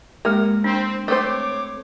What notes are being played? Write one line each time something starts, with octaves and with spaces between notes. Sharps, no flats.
G#3 A#3 G4 A#4
C4 D4
A3 C4 C5 C#5 D6